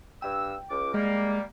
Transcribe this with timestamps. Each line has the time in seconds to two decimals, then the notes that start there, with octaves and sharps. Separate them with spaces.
0.22 G2 G5 E6
0.70 C#2 D6
0.94 G3 G#3 A#3